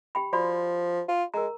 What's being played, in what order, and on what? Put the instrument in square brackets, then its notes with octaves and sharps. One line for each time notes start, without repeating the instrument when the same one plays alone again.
[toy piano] G4 G5 B5
[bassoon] F3 [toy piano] F#4 D5 B5
[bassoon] F4
[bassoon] G#3 [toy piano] A#4 A#5